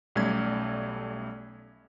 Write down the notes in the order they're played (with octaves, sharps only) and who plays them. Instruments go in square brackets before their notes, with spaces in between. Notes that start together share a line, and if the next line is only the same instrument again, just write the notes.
[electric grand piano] B1 G3 A3 C#4 D5 G#6